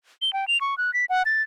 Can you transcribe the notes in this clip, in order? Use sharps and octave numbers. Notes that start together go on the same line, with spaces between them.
G7
G5
F7
C#6
F#6
B6
F#5
A6